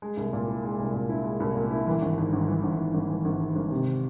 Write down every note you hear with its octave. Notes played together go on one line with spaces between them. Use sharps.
G#3
C2
A#2
E4
G#3
C2
A#2
E4
G#3
C2
A#2
E4
E3
G#1
G#2
G#1
E3
G#1
G#2
G#1
E3
G#1
G#2
G#1
C3